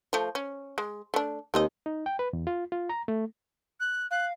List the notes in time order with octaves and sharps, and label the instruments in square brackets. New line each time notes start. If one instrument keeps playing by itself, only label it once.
[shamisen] F3 A3
C#4
G#3
A3 D4
[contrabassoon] D#2 [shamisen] C4 D#4 D#5
[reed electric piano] D#4
G5
B4
E2
F4
F4
A#5
A3
[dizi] F#6
[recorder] F5 [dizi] F#6